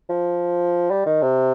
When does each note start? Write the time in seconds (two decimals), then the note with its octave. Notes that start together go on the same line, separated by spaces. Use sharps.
0.09 F3
0.90 G3
1.06 D#3
1.22 C3